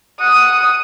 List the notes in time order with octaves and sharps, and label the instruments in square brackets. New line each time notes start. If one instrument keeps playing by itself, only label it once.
[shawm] F#5 [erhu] D#6